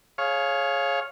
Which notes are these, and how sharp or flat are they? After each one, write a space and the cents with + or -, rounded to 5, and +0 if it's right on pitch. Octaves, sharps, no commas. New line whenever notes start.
G#4 +25 C#5 -10 F5 +0